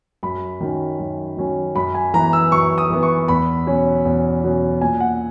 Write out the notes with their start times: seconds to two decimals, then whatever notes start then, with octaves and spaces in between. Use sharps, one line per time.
0.23 F#2 B5
0.61 D#3 F#3 C#4
0.99 F#2
1.37 D#3 F#3 C#4
1.75 F#2 B5
1.94 G#5
2.14 E3 B3 A#5
2.33 E6
2.52 F#2 C#6
2.78 D#6
2.90 E3 B3
3.03 C#6
3.28 E2 B5
3.66 B2 F#3 C#4
4.05 E2
4.43 B2 F#3 C#4
4.81 A#2 G#5
5.00 F#5